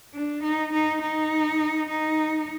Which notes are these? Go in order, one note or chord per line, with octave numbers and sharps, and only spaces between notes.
D4
D#4
D#4
D#4
D#4